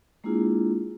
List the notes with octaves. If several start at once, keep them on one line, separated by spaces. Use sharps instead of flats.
G#3 A#3 D4 E4 F4 G#4